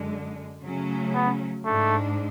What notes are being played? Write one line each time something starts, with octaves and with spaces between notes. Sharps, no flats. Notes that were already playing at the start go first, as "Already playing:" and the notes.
Already playing: F#2 D3 G#3
C#3 F#3 A3 C#4
B3
G#2 G#3 A3 D4